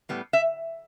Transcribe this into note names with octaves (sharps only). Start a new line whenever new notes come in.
A2 G3 B3
E5